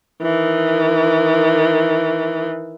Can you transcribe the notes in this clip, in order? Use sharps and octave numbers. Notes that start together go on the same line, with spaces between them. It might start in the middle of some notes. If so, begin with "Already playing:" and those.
D#3 E3